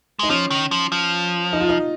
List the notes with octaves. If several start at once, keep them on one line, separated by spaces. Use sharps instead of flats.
G#3 D#4
F3 C#4
D#3
F3
F3
D#4
F4
D#4